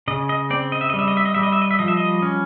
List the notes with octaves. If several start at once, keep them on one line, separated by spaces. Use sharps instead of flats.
C#3 D#5
D#5
C4 D5
D#5
E5
D#5
G3
E5
D#5
E5
D#5
G3 E5
D#5
E5
D#5
E5
F3 D#5
E5
D#5
C#4